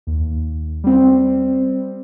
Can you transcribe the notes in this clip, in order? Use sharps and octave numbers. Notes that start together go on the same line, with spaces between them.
D#2
G3 C4